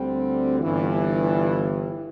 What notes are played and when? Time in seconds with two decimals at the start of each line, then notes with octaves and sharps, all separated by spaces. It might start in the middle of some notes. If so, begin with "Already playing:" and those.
Already playing: D2 D3 G3 C4
0.61 G1 G2 E3